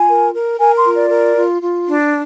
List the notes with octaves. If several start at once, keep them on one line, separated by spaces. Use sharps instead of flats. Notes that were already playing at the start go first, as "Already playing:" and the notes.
Already playing: F4 G#5
A#4
A#4
A#4 G#5
C6
F4
D5
A#4
F4
F4
D4